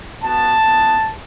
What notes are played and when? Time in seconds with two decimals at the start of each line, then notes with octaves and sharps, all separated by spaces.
0.24 B3 F#4 A5
0.65 B3 E4